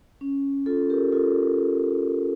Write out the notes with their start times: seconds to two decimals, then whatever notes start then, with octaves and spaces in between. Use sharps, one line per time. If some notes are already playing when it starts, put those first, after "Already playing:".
0.21 C#4
0.66 F4 A4
0.90 G4 A#4
1.12 F4 A4